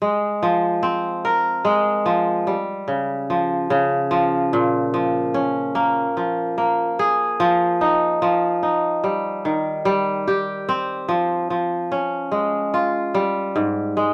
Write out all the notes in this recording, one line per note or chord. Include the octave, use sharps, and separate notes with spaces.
G#3
F3
C4
A#4
G#3
F3
G3
C#3
F3
C#3
F3
A#2
F3
C#4
A#3
F3
A#3
G#4
F3
D#4
F3
D#4
G3
D#3
G3
G4
C4
F3
F3
C#4
G#3
F4
G3
G#2
G#3